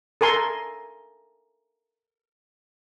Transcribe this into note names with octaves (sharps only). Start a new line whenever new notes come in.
A4 A#4 G#5 C6